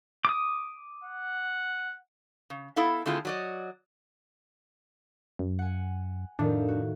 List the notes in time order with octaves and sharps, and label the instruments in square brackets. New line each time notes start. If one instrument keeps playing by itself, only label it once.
[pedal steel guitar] D6 D#6
[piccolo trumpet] F#5
[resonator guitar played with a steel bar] C#3
B3 E4 A4 E5 F5
D3 A3 C4 E4 F4 G#4
F#3 D5 D#5
[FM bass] F#2
[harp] F#5 G#5
[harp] F2 A2 D#3 [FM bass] D4
[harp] F#4